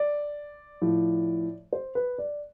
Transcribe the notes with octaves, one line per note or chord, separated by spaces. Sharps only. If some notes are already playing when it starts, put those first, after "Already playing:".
Already playing: D5
A2 F3
C5
B4
D5